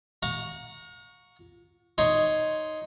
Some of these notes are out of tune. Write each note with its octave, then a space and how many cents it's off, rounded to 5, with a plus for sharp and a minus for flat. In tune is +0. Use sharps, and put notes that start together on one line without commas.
F5 +45 A#5 +0 C#6 +0
D#4 +0 C#5 +0 C6 +0